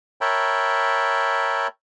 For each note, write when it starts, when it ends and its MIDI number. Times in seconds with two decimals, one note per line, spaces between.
0.21 1.67 70
0.21 1.67 73
0.21 1.67 76
0.21 1.67 79
0.21 1.67 81
0.21 1.67 83